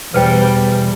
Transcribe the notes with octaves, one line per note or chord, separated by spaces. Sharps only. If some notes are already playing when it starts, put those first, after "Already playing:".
E2 B2 G3 B4 C5 G5